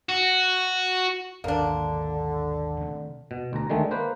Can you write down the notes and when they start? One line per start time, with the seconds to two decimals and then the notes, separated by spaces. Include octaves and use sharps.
0.09 F#4
1.44 G#1 D#2 B2 D3 A#3 D4
2.80 C3 D#3 A3
3.31 B2
3.53 D2 A#5
3.70 D3 D#3 G#3 A3
3.91 A#3 B4 C5